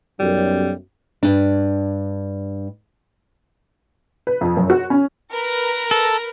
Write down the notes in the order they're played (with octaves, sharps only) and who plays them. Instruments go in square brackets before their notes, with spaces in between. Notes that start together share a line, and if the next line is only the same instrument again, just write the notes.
[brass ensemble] B1 F#2 [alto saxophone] G3
[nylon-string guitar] G2 D4
[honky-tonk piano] B4
F2
F#2
F#4
C#4
[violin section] A#4 B4 A#5
[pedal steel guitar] A4